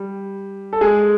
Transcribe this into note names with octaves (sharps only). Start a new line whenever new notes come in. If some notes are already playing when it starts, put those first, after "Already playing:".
Already playing: G3
A4
G#3 G#4